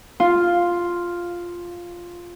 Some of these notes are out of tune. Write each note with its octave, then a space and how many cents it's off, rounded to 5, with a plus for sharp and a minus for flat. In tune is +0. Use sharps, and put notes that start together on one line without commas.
F4 +0